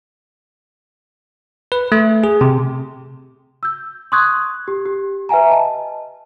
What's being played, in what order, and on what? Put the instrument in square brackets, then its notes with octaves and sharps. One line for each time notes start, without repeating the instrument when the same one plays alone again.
[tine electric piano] B4
A3
G#4
C3
[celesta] E6 G6
C6 C#6 D#6 F#6 G#6
G4
G4
B4 E5 F#5 G#5 A#5
D#5 A5